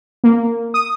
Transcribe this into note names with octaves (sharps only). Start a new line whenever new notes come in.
A#3
D#6